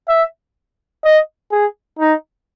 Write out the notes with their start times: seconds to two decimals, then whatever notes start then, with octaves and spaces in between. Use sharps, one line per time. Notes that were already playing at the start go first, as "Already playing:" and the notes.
0.08 E5
1.04 D#5
1.52 G#4
1.99 D#4